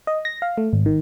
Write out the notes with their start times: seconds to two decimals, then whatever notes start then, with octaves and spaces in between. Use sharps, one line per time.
0.07 D#5
0.25 A#6
0.42 F5
0.58 A3
0.73 G#1
0.86 D#3